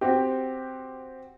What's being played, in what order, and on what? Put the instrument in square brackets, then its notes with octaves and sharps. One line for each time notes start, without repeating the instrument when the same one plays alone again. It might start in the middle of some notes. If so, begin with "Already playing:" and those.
[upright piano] C4 F#4 G4